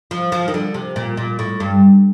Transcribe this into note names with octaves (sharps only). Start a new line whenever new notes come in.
F3
F3
D#3
D3
C3
A#2
A#2
A2
G2